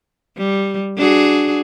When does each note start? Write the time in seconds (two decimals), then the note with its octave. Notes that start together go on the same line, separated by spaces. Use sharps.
0.37 G3
0.97 D4 F#4 G#4